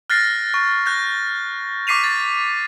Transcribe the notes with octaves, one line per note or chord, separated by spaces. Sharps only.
F6 F#6 A6 A#6 C7
C#6
F#6 G6 A#6
C#6 D6 B6 C7 D#7 F7
A6